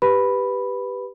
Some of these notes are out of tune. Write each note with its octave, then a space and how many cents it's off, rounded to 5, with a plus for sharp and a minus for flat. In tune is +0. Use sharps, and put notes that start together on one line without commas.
G4 +0 B4 +0 B5 +0